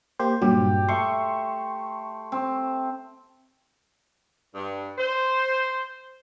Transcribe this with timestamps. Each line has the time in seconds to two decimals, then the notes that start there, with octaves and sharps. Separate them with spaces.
0.19 A#3 G4 C5
0.42 G2 A#2 F#3 G4
0.89 A3 C6 C#6
2.32 C4
4.55 G2
4.98 C5